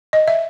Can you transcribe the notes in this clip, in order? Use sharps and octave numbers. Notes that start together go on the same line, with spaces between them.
D#5
E5